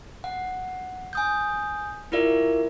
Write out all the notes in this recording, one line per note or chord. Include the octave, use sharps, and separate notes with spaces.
F#5
G#5 D#6 G6
E4 F4 G4 A#4 D5 E5